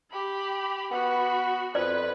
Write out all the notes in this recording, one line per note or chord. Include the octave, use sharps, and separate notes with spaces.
G4 B5
B3 F#4 B5
F2 B4 D5